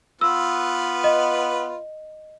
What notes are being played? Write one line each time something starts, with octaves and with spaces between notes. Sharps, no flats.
B3 F4 B4 E6
D#5